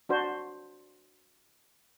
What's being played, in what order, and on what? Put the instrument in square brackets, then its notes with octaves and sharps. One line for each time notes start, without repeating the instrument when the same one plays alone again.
[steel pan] D4 F#4 C5